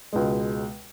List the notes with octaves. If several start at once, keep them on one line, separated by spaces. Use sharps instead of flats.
C#2 B2 G#3